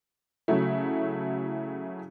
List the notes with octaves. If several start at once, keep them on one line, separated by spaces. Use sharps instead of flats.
C#3 F#3 A3 E4